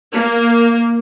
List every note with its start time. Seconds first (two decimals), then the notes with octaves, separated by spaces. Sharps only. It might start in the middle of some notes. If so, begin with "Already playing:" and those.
0.14 A#3